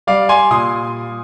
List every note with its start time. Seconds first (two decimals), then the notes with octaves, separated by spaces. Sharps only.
0.07 G3 D5 F5
0.29 G#5 C6
0.51 A#2 C6 D#6